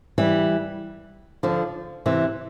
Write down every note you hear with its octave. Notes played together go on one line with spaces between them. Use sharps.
E3 G3
D3 F3
C3 E3